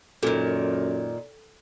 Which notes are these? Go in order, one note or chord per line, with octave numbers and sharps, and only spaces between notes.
F#2 A#2 D#3 A4